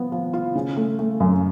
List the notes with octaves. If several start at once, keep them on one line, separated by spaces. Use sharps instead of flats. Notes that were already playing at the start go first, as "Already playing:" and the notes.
Already playing: F3 B3
F3
F4
C#3
A3
A3
F#2